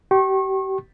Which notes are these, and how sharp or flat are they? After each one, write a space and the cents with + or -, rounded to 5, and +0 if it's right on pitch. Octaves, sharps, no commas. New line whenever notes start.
G4 -35 C#6 -35